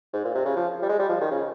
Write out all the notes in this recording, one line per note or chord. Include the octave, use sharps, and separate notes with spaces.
G#2
A#2
C3
C#3
F3
G3
G#3
G3
F3
D#3
C#3